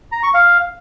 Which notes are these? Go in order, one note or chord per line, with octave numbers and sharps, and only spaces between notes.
A#5
C#6
F5